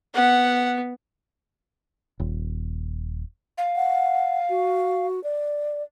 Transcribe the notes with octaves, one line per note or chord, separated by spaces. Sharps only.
B3 F#5
D#1
F5
F#5
F#4
D5